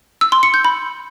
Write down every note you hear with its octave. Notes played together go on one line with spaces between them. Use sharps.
E6
C6
C#7
G6
B5